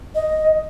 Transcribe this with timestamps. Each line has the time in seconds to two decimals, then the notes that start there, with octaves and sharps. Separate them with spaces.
0.15 D#5